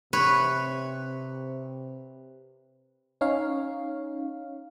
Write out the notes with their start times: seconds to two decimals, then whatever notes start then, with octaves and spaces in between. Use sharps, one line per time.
0.13 C3 B4 C#5
3.21 C#4 D#4 C#5 F5